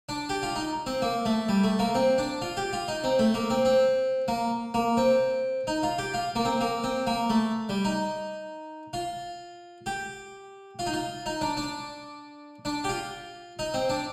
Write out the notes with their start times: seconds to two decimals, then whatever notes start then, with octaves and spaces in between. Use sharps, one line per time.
0.09 D4
0.29 G4
0.43 F4
0.55 D#4
0.86 C4
1.02 A#3
1.25 A3
1.48 G3
1.64 A3
1.79 A#3
1.95 C4
2.18 D4
2.42 F4
2.57 G4
2.73 F4
2.88 D#4
3.04 C4
3.19 A3
3.34 A#3
3.50 C4
3.65 C4
4.28 A#3
4.74 A#3
4.97 C4
5.67 D#4
5.83 F4
5.98 G4
6.14 F4
6.36 A#3
6.45 C4
6.61 A#3
6.84 C4
7.07 A#3
7.30 A3
7.69 G3
7.85 D#4
8.93 F4
9.86 G4
10.79 F4
10.86 D#4
10.93 F4
11.26 D#4
11.41 D4
11.57 D4
12.65 D4
12.84 G4
12.89 F4
13.59 D#4
13.74 C4
13.89 D4